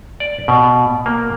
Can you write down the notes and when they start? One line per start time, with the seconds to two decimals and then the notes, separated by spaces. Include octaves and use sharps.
0.20 D5
0.48 B2
1.06 A#3